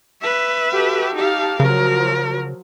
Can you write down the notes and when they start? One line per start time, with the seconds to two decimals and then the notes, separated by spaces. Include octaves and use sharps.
0.22 B4 E5
0.71 F#4 G4 A4
1.15 D#4 G4 F5 A5
1.60 C#3 F3 F#3 A#4